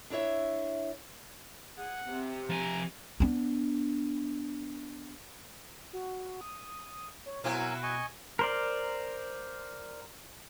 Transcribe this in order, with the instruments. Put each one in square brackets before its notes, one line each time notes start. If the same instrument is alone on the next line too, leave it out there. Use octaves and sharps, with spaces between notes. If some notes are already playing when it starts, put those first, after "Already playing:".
[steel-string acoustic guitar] D4 E4 C#5 E5
[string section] G#4 [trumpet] F#5
[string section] C3
[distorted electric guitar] F3 G#5 [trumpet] A#5
[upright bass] B3 D4
[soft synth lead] F#4
D#6
C#5
[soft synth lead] B2 [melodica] F#3 A#4 G#5 [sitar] C4 E4 F#4
[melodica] D#5 G#5 C#6
[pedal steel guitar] A#4 C5 D5